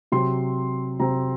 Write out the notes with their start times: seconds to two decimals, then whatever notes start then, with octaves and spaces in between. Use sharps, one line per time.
0.12 C3 F#3 C4 C6
0.99 C3 F#3 C4 A#5